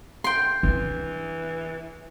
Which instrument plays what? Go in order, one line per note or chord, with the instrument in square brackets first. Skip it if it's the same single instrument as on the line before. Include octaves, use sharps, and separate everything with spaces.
[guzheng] G5 C6
[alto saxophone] E3 [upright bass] D4